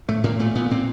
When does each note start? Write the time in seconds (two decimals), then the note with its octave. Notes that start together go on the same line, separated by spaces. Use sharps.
0.08 A2 A3
0.24 A2 A#3
0.39 A#2 A3
0.55 A#2 B3
0.71 A#2 C4